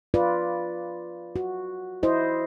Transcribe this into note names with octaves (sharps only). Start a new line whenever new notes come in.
F4 B4 D5
F#4
E4 C5 D#5